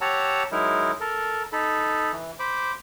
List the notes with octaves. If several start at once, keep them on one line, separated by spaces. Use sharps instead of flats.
G4 C#5 F#5 A5 A#5 E6
F#3 G#3 D#4 E4 A#4
A4 A#4
D#4 A4 B5
E3
C5 B5 D6